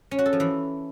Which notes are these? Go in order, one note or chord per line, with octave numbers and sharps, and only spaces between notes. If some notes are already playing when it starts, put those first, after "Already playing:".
C#4
F#4
A4
F3
E3